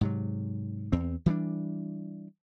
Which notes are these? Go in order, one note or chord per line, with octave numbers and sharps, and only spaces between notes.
G#2 C3 F#3
E2 C4
E3 G3 B3 D4